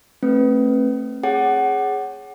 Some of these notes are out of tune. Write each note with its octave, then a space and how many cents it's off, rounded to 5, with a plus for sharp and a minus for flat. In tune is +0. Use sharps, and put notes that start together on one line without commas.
A3 +20 C4 +35 B4 +0
G#4 +0 C#5 +0 F#5 +20